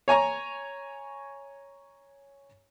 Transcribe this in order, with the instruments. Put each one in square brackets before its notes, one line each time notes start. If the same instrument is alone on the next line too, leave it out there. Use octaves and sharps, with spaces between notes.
[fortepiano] C#5 G#5 A#5 C#6